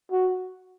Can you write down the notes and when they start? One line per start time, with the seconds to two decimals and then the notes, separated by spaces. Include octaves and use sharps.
0.12 F#4